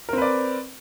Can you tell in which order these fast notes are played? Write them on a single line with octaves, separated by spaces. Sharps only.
A#4 C4 B4 D5